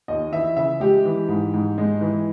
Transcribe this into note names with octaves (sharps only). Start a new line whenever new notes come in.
D#2 D#5
E3 E5
C#3 E5
G#3 G4
E3
G#2
G#2
G#3
E3